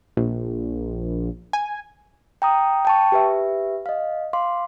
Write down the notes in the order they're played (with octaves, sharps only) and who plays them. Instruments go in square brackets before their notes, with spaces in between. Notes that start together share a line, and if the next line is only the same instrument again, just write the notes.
[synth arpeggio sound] A#1
G#5
[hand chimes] G5 A#5 D#6
G5 A5 C#6
G4 B4 E5
D#5 F5
F5 C6 D6